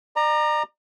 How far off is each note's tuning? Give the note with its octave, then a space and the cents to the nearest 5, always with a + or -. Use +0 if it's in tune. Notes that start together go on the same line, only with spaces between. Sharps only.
D5 +40 A#5 +0